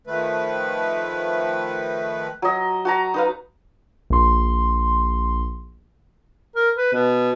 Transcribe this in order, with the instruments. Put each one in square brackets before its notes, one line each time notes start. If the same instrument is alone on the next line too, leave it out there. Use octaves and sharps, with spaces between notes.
[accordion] D#3 F3 A3 B4
[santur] F#3 D#5
F#4 A5 A#5
D#4 B4 F5
[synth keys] A#1 C6
[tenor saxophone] A#4
B4
B2